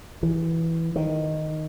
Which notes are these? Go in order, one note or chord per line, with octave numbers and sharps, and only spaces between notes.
E3
D#3